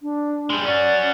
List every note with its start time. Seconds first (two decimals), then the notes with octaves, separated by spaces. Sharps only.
0.02 D4
0.50 G3 G#3
0.65 C#4 F#4 D5